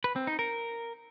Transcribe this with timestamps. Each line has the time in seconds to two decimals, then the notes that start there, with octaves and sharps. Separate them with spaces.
0.04 B4
0.16 C4
0.27 D#4
0.39 A#4